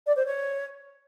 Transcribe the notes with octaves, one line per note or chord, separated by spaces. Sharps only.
D5
C5
C#5